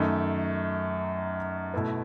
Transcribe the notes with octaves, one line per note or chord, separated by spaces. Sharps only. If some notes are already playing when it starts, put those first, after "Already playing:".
Already playing: F#2 D#3 A3 D#4
B2 A3 E4 B4